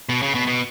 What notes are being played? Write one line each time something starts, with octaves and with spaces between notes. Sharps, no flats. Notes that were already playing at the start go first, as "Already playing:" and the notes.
B2
C#3
B2
B2